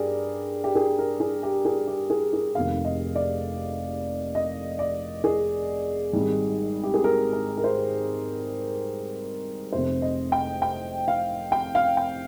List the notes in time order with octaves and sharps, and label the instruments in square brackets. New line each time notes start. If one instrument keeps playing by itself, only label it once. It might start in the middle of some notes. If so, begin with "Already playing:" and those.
Already playing: [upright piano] G2 G4 G#4 A#4 D5
G4
G#4
A#4
G#4
G4
G#4
G4
G#4
G#4
F1 F2 D#3 A#3 F5
D#5
D5
D#5
D5
G#4
G#1 G#2 G3
G4
G#4
A#4
A#4
A#4
C5
F1 F2 C3 C5
D#5
G5
G5
F5
G5
F5
G5